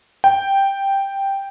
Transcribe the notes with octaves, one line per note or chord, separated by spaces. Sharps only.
G5